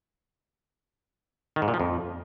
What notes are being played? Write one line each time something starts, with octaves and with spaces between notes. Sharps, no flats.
D#3
G#2
A#2
F3
F2